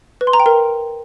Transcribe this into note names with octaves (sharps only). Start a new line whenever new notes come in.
B4
C6
A#5
G5
A#4